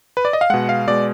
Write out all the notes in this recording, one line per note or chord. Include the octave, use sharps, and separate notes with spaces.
B4
D5
D#5
F5
B2 G#3 F#5
F5
B2 G#3 D5